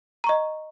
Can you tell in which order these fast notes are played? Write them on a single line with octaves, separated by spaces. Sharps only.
A#5 C#6 D#5